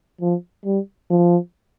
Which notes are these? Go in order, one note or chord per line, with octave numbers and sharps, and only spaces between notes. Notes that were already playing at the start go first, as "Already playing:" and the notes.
F3
G3
F3